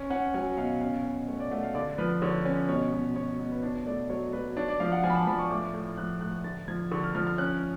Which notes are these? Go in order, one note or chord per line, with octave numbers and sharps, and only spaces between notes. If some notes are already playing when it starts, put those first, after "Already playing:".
Already playing: C#4
C#4 F#5
F#3 G#5
B2 F5
C#4 F5
C#4
A3 C#5
D5
A3 F#5
F5
D3 D5
F3 B4
D3 C#5
C#4
B2 C#5
B2
B2 C#5
B2
B4
D4 C#5
A3 D5
F#3 C#5
F#3 B4
D4 C#5
D5
F3 F5
F#5
F3 G#5
B5
A5
F3 B5
C#6
A2 D6
A2
F3 F#6
A2 F#6
D3 A6
F3 G#6
D3 C#6
F6
F3 F6
F6
C#4 F#6